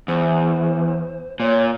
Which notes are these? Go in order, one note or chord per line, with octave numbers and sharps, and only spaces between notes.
E2 C5
A#2 C#5